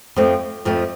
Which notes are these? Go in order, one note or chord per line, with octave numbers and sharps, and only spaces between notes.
F2 F3 A3 C4
F2 F3 A3 C4